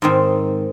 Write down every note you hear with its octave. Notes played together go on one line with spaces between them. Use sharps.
G#2 D#3 C4